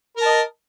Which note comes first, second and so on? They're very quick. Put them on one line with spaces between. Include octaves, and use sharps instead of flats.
A#4 A5 D#5